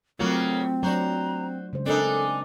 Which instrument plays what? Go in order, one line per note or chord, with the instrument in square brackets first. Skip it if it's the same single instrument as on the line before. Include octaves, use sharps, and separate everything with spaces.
[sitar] C#3 A#3 F#4 [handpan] F#3 A3 F4 [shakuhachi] C4
[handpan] F#3 D4 D5 [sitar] F#4 C5 [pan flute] A#5
[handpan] C#3 G#3 C5
[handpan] C4 A#4 [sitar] D4 D#4 [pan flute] A4 [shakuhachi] G#5